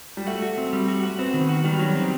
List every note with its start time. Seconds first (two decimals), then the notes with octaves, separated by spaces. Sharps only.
0.17 G3
0.27 A3 F#4
0.42 F#4
0.58 C4
0.73 G3
0.88 F#4
1.03 F#4
1.19 B3 C4
1.34 D#3
1.49 F#4
1.64 D#3 G3
1.79 F#3
1.95 C4
2.01 D#3